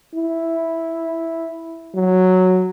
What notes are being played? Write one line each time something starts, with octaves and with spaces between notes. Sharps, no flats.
E4
F#3